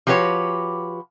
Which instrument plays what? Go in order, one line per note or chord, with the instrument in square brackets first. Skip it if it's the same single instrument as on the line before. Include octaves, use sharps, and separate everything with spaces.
[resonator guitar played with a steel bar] F3 F#4 G4 B4 C#5